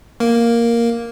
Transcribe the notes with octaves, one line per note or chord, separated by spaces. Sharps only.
A#3